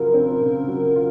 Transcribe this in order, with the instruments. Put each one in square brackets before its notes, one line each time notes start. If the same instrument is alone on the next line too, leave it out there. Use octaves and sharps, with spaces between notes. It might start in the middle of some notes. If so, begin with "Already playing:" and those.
Already playing: [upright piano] C#3 F#3 F4 [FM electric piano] A#4
[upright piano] C4
C#3
F#3
F4